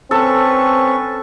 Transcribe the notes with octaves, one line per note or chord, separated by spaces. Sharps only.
C4 C#4 A4 B4 C#6